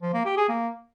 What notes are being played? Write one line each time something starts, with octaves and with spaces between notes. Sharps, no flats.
F3
A#3
G4
G#4
A#3